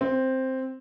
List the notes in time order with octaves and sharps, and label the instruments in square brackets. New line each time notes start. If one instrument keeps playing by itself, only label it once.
[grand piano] C4